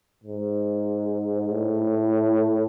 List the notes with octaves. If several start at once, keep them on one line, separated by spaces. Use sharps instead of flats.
G#2
A2